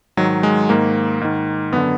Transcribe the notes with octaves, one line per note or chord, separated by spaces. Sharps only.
G#2 D#3 F#3
G#3
G#2 D#3 A#3
G#2 D#3
F#2 D3 B3